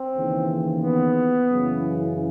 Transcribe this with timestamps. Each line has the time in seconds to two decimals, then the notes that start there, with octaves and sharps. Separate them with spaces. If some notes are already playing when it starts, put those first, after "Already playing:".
Already playing: C4
0.16 D#2 C#3 E3
0.81 B3
1.47 F#1 F#2 C#3 E3